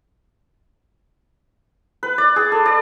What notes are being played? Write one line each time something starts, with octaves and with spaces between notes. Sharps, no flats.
B4
D5
G#4
A4
D5